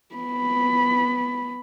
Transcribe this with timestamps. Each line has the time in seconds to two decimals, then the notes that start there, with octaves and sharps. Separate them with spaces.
0.15 B3 B5